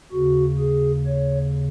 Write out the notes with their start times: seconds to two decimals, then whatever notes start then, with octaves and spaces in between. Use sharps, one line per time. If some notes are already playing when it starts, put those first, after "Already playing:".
0.12 D#2 C#3 F#4
0.59 G#4
1.06 C#5